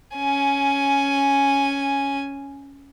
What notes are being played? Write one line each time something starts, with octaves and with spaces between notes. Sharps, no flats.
C#4 G#5